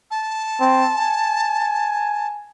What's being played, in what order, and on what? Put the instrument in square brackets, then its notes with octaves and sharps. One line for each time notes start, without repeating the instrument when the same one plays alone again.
[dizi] A5
[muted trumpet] C4
G#5